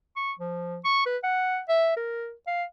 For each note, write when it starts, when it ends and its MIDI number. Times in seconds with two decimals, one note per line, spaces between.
0.16 0.32 85
0.39 0.78 53
0.85 1.03 85
1.06 1.17 71
1.24 1.59 78
1.69 1.92 76
1.97 2.33 70
2.47 2.64 77